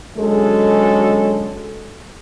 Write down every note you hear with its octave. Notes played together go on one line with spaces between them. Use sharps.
D3 F#3 G#3 C#4 G#4 A4